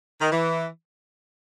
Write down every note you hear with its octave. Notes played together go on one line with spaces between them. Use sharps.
D#3
E3